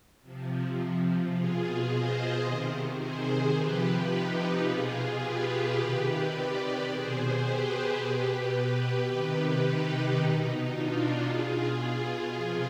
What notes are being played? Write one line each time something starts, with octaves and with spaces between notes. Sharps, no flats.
C3 F3
B2 F4 G#4
C5 D#5
C3 D#3
G#4 C5
C3 F3 G4 B4
D#4 G4
B2 F4 G#4
G4 B4
C3 D#3
B4 D5
B2 G#4 C5
G4 B4
B2
G4 B4
C3 D#3
D#4 G4
B2 D#4
D4 F4
B2 F4 G#4
C3 F3